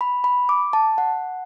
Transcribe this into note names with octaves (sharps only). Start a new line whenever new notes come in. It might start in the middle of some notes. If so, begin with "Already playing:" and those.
B5
B5
D6
A5
F#5